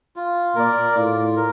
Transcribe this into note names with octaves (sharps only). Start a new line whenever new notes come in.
F4
A#2 A#4 D5
A2 F4
A#4